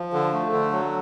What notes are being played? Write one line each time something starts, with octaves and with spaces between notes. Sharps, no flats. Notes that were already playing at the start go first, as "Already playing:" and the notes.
Already playing: F3
D3
A3
D3
F#3